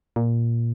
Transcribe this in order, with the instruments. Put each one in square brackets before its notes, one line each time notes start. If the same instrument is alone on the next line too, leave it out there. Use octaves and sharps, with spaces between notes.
[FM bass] A#2